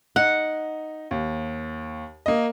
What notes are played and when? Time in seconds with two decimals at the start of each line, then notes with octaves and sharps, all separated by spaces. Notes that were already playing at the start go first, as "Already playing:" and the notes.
0.16 D#4 F#5
1.11 D#2
2.26 A#3 D#5